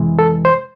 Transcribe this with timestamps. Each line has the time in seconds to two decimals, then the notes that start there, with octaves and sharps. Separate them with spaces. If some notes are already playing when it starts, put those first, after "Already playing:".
Already playing: F2 C3 E3 G#3
0.19 A4
0.45 C5